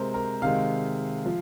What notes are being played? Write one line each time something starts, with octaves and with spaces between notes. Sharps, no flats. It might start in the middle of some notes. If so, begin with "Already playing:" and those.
Already playing: C3 G#3 A#4 C5
A#4
C3 D#3 G#3 F5
F3